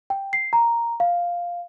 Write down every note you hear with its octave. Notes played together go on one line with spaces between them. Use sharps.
G5
C7
A#5
F5